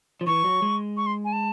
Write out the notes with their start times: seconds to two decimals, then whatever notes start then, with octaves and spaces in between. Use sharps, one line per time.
0.21 F3
0.27 E3 C#6
0.45 F#3
0.62 G#3
0.97 C#6
1.06 C6
1.25 G#5
1.33 A5